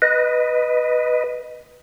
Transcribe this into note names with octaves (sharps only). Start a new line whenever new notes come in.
B4 D#5